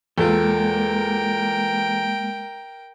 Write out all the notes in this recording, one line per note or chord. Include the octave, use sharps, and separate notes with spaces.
E2 G#3 A#3 F4 A4 A#4 G5